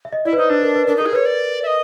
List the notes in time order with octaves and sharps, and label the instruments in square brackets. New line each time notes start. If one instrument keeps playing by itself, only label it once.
[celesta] E5
D#5
[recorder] E4 [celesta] D5
[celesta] B4
[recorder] D#4 [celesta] C5
[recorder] D4 [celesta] B4
[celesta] A#4
B4
[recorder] D4 [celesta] A#4
[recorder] D#4
[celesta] A4
[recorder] G#4
[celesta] B4 [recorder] C#5
[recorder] D5
E5
D#5